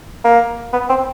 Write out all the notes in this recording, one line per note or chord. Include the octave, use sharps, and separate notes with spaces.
A#3
B3
C4